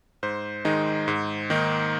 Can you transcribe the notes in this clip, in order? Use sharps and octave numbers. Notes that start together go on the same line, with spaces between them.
G#2 C5
D#3 G#3 D#4
G#2
D#3 A#3 D#4